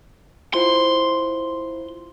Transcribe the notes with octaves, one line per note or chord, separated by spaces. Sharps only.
E4 F4 C5 C6